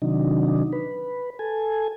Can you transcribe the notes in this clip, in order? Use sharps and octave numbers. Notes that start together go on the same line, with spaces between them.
C3 D#3 F#3 D4 D#4
B4
A4 G#5